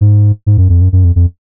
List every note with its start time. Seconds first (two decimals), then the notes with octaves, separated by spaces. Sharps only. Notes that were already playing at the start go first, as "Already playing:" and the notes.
0.01 G#2
0.46 G#2
0.58 F#2
0.69 F2
0.81 F#2
0.93 F#2
1.04 F2
1.16 F2